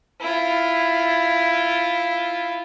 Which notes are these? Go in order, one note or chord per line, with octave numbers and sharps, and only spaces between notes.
E4 F4